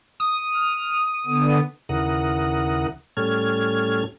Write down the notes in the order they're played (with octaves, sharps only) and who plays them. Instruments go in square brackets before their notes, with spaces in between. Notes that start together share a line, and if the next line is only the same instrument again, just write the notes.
[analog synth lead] D#6
[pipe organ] F6
D3 B3
[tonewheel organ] D#2 C#3 E3 A#4 F#5 D#6
A2 G3 C#4 A4 F6 G#6